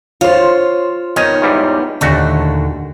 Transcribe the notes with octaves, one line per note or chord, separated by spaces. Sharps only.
F4 C5 C#5
D#3 B3 D#4 C#5 G#5
E2 G#2 G3
D#2 A#2 D3 A3 F#4